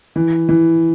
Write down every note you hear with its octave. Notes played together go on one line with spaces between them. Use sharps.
E3
E3